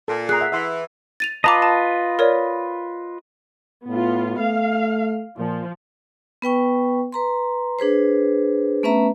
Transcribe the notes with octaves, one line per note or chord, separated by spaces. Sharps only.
A#2 A4
G#4 A#5 F#6 C7
E5 F#5
E3 E5 F#5 C6
A6 D#7 F7
F4 B4 D#5 A5 A#5 D6
A5
A#4 C#5 D5
A2 B3 F4
A3 F5
A#2 F3
B3 B4 G5 C#6
B4 A#5 C6
D4 G#4 B4 C5
A3 B3 C#4 B4 E5 A#5